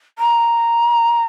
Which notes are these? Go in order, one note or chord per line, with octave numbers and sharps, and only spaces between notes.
A#5